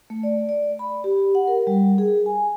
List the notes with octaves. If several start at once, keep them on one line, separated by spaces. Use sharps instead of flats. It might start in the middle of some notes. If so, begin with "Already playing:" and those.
A3
D5
D5
B5
G4
F#5
A#4
G3
G#4
G#5